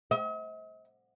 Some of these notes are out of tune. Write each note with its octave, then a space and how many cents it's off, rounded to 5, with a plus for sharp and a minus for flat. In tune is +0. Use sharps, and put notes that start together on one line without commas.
D#5 +45